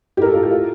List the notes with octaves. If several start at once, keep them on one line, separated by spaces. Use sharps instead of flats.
A2 G4 A#4
A4
A2 F4
G4
F4